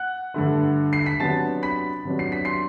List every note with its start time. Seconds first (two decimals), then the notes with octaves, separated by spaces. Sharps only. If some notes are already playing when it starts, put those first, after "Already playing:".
Already playing: F#5 F#6
0.34 G2 D3 A3
0.93 C7
1.06 B6
1.20 C3 F#3 B3 D4 A5 A6
1.62 B5 B6
2.05 C3 F#3 B3 D4
2.19 C7
2.32 B6
2.45 C6 C7